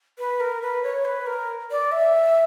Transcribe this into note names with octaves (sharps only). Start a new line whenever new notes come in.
B4
A#4
B4
C#5
B4
A#4
D5
E5